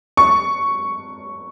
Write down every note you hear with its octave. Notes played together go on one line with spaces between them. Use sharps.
C#6